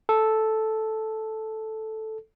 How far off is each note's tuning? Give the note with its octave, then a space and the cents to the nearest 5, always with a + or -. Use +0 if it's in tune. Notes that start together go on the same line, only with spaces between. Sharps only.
A4 -5